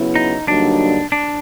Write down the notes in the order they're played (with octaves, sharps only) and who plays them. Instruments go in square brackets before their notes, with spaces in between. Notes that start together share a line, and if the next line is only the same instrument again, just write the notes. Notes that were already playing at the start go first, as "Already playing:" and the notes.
Already playing: [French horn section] C#3 F#3 B3 E4
[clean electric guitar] D#4
[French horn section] G2 D3 F#3 A#3 D#4 [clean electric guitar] D4
[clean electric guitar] D4